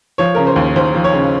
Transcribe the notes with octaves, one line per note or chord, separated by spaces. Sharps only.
F3 C#5
C#3 A#4
C5
D#2
D#2 C5
F3
C#5
C#3